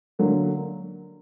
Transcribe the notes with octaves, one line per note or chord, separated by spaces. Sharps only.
D3 F#3 A#3